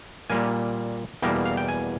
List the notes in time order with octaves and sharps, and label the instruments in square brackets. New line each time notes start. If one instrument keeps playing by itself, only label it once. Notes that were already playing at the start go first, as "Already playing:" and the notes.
[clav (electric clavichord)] A#2 G3 A#3 G#5
E2 B2 G3 A#3 G5
F5
G5
G#5